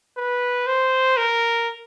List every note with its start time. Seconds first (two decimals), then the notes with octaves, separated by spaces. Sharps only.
0.17 B4
0.67 C5
1.17 A#4